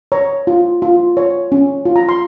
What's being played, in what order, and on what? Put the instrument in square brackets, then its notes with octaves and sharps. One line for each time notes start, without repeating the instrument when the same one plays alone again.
[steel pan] C#5 A#5
F4
F4
C#5
C#4
F4
A#5
C6